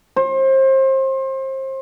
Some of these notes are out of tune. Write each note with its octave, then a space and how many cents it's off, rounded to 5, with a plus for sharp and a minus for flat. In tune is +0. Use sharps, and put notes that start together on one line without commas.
C5 +30